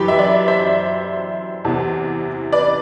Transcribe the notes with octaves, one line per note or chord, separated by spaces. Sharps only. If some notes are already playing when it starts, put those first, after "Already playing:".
Already playing: F#2 E3 G4 B4
E5
B4 D5
C5 E5
E2 C3 E3
B4 D5